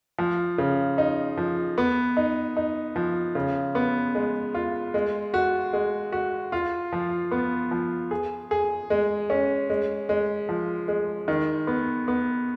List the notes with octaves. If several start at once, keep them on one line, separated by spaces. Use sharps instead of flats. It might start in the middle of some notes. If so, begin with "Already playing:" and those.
F3
C#3
D#4
F3
B3
D#4
D#4
F3
C#3
B3
G#3
F4
G#3
F#4
G#3
F#4
F4
F3
B3
F3
G#4
G#4
G#3
C#4
G#3
G#3
F3
G#3
D#3
B3
B3